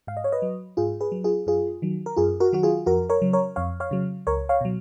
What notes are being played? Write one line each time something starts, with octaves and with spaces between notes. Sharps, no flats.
G#2 F5
D#5
C#5
B4 D#5
F#3
G#2 F4 G#4
G#4 B4
F#3
F4 G#4
F#2 F4 G#4
D#3 F#3
A#4
F#2 F4 G#4
F#4 A#4
D#3 F#3 F#4
F4 G#4
F2 F#4 A#4
A#4 C#5
C#3 F#3
A#4 C#5
F2 C#5 F5
C#5 F5
C#3 F#3
C#2 A#4 C#5
C#5 F5
B2 F#3